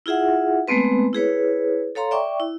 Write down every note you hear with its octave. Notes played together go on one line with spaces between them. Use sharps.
E4 F4 G#4 E5 F#5
G#3 A3 B3 C4 B4
E4 G#4 B4 C#5
A4 C#5 F5 A#5 C6
D5 E5 G5 C#6 D6
E4